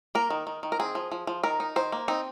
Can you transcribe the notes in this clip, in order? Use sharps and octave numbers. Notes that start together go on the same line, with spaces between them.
A#3 A#4
D#3
D#3
D#3
A#4
C4 G#4
F3
F3
F3
D#3 A#4
D#4
D#3 C5
A#3
C4 D#4